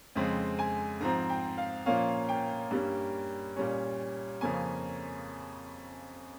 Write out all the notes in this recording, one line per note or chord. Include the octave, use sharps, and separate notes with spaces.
F2 C#3 G#3 C4
G#5
G#2 F3 C4 A#5
G5
F5
A#2 F3 A#3 C#4 F5
G5
G2 G3 A#3 C#4
A#2 G3 C#4
F2 C#3 F3 A#3 C#4 G#5